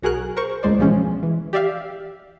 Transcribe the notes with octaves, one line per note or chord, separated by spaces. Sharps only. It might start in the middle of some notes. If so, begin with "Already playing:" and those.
B1 F#4 G#4 A#4 F#6
A#4 C5 C#6
C#2 A2 G#3 C5 D5
B2 E3 F3 G#3 C#4
E3
G4 D5 E5 F5